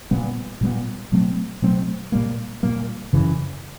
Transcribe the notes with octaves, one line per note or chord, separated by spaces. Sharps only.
A#2 G3 B3
A#2 G3 B3
B2 F#3 A3 C4
B2 F#3 A3 C4
A#2 G3 A#3
A#2 G3 A#3
F#2 C#3 E3